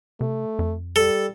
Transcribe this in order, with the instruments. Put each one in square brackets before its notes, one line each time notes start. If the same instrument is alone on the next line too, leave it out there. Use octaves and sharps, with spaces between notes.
[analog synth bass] C3 [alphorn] A3
[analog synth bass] F2
[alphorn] G3 [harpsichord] A4